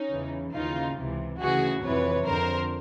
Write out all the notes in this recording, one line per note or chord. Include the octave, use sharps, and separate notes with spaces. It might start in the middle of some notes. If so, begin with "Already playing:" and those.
Already playing: C#4 D#4
E2 C#3 E3
D#2 C#3 E3 D#4 F4
C#2 C3 E3
D2 C#3 E3 F#4 G#4
F2 C3 E3 B4 C#5
F2 D3 A#4 C5